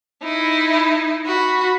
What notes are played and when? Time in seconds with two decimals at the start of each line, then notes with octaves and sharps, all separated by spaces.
0.23 D#4 E4
1.26 F#4 B5